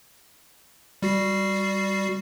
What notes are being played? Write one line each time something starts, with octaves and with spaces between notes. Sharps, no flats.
G3 F#4 C7